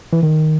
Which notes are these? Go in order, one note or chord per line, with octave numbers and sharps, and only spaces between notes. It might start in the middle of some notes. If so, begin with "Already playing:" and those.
E3
D#3